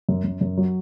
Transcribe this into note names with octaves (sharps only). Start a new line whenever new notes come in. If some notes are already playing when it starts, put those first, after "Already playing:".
F#2
F#2
F#2
F#3